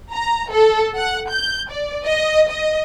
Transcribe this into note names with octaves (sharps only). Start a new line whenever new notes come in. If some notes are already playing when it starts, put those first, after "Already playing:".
A#5
A4
F#5
G6
D5
D#5
D#5